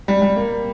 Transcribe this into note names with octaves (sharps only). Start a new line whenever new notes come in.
G3
G3
A#3